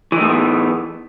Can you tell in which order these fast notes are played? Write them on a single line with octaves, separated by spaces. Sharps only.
E3 D#4 A3 A2 B3